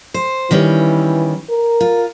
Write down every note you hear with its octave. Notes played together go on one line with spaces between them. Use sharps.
C5
D#3 E3 G3 C#4
A#4
F4